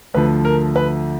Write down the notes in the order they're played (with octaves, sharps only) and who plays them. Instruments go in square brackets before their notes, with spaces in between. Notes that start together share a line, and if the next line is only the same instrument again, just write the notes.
[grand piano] D2 D3 F3 B4
A#4
B4